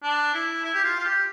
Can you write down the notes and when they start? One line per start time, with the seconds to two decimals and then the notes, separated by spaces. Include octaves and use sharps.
0.03 D4
0.34 E4
0.64 E4
0.74 G4
0.84 F4
0.99 F4
1.05 G4